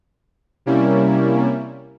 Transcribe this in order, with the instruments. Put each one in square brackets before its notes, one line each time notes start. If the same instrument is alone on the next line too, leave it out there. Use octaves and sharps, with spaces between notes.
[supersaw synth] C3 G3 A#3 C#4 E4